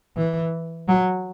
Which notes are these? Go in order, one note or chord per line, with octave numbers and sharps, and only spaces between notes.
E3
F#3